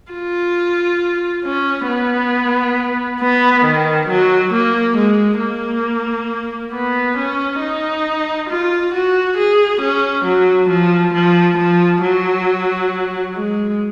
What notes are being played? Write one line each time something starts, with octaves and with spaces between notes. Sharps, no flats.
F4
C#4
B3
B3
D#3
F#3
A#3
G#3
A#3
B3
C#4
D#4
F4
F#4
G#4
C#4
F#3
F3
F3
F3
F#3
G#3